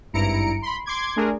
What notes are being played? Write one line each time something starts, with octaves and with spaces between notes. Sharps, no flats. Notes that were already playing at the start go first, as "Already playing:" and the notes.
G#1 G2 E4 A#5 C#7 D7
B5 C6
C6 D6 G#6
A3 D4 G#4 A#4